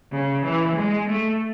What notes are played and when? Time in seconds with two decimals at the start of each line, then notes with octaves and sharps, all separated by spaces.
0.12 C#3
0.43 E3
0.76 G#3
1.09 A3